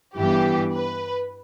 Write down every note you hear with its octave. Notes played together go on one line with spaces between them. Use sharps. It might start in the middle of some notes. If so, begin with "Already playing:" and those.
G2 E3 B3 G4
B4